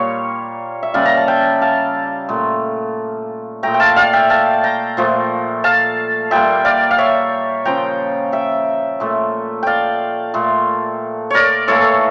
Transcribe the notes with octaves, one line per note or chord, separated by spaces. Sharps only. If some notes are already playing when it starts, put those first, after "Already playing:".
Already playing: A#2 G3 A#3 C#5
E5
C#3 G3 A#3 D5 F5
A#5
A5
E5 G5
F5 A5
A#2 A3
A#2 A3 G5 A#5
G5
F5 A5
D5 F5
E5 G5
F5 A5
G5 A#5
A#2 F3 A3
F5 A5
A#2 G3 A#3 E5 G5
D5 F5
F5
C#5 E5
C#3 F3 A#3 G5 A#5
E5 G5
A#2 A3
D5 F5 G5
A#2 A3
A#4 C#5 D5
A2 E3 A#3 A4 C#5